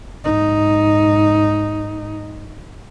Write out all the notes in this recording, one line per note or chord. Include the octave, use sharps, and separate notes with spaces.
G#2 D#4